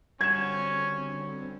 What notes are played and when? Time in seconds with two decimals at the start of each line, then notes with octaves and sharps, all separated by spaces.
0.21 D3 G3 C4 C#4 F#4 G#6 E7